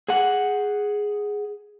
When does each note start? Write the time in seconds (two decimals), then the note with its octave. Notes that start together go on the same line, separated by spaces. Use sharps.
0.08 G#4 F#5